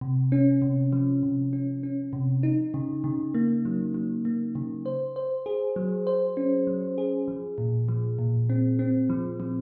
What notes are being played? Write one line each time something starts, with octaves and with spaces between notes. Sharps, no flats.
C3
C#4
C3
F3
C3
C#4
C#4
C3
D#4
C#3
C#3
A#3
F#3
F#3
A#3
C#3
C5
C5
G#4
F#3
C5
C#4
F#3
G#4
F3
A#2
F3
A#2
C4
C4
F3
F3